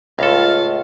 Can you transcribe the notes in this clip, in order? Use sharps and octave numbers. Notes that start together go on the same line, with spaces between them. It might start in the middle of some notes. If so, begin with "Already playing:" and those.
C#2 A2 F4 A4 F5